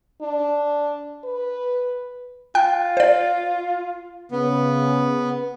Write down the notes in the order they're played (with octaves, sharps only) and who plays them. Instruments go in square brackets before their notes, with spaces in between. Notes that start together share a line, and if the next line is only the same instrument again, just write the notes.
[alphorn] D4
B4
[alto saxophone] F4 [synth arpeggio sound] G5 F#6
[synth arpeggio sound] C5 D5
[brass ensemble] C#3 [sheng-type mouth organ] B3